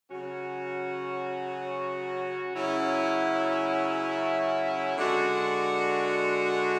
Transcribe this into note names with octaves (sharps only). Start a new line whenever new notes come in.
C#3 F#3 C#4 F#4
C#3 F#3 C#4 E4
D3 G#3 D4 F#4